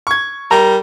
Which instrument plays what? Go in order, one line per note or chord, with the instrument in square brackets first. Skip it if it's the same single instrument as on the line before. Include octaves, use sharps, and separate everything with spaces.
[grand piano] C#6 G#6
[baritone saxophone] G3 [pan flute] A#4 [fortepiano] A#5